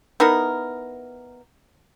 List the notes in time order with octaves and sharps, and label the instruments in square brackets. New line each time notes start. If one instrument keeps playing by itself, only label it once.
[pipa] B3 D#4 E4 A#4